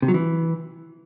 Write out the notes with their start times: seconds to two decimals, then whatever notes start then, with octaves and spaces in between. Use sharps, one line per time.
0.02 C3
0.08 F#3
0.14 E3